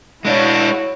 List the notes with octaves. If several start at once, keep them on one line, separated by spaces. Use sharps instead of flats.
G#3 D4 E4 F#4 C#5